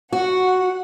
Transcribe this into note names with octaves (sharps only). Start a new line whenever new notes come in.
F#4 F#5